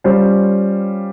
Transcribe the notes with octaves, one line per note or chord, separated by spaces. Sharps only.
G3 C#4 F4 C5